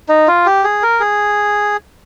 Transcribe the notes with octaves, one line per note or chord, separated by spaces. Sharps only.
D#4
F4
G4
G#4
A#4
G#4